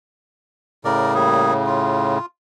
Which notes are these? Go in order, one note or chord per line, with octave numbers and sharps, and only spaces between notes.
A2 C#3 A#4 D5
G3 A#3 G#4
F4